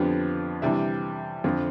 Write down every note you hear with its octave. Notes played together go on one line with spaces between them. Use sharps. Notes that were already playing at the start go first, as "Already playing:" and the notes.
Already playing: F2 D3 F3 B3 D4 G4
C3 E3 G3 D4 E5
F2 D3 F3 C4